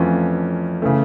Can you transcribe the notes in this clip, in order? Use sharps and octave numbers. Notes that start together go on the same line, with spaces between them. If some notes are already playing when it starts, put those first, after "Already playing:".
Already playing: F2 E3 A3 C#4 F4
C#3 E3 A3